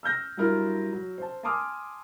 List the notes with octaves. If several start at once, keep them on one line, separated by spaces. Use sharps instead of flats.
E6 F6 G6 A#6
G2 F#3 E4 F4 A#4 F6
F#3
C5 A5
G#5 A5 C6 D6 D#6 F6